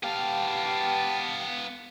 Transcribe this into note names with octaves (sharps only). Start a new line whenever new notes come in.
B3 G4 F5 G5 A5